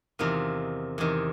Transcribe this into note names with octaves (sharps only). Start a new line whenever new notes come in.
E2 C3 D#3 F4
E2 C3 D#3